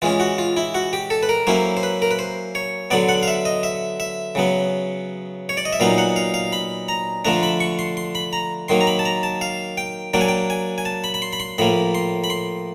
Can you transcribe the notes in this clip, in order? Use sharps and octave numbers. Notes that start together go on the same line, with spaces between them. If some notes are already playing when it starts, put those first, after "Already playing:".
E3 G#3 C#4 F4
F#4
F4
E4
F#4
G4
A4
B4
A#4
F#3 A#3 C#4 E4 C5
C5
B4
A#4
B4
C5
C#5
D3 F#3 B3 D5
F#5
F5
E5
D#5
E5
E5
C#3 F#3 B3
C#5
D5
D#5
E5
A#2 F#3 B3 D#4 F5
F#5
F5
F5
B5
A#5
D3 F3 A3 D4 A#5
B5
C#6
C6
C6
B5
A#5
D#3 F#3 A#3 C6
A#5
B5
A5
A#5
A5
F5
G5
F#3 A#3 D4 G5
G#5
G5
G#5
G#5
A5
B5
B5
C6
B5
C6
A2 F3 A#3 B5
C6
B5
C6